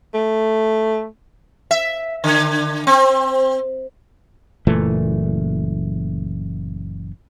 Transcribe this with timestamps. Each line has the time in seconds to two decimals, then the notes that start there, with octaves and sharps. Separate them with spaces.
0.14 A3
1.71 E5
2.24 D3
2.87 C4
4.67 F#1 A#2 E3 A3